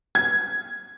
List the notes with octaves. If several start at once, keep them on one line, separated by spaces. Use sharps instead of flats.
G#6